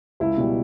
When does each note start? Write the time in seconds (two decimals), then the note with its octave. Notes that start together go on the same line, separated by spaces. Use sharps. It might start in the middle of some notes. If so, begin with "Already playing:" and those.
0.20 C#2 E4
0.37 B2 G3